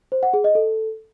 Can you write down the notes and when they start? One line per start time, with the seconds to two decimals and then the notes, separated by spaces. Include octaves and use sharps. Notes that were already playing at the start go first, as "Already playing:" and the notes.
0.12 C5
0.23 F#5
0.34 G#4
0.44 D#5
0.55 A4